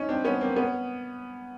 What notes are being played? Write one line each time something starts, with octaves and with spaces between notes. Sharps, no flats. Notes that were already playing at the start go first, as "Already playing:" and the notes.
Already playing: C#4 D#4
C4 D4
B3 C#4
A#3 C4
B3 C#4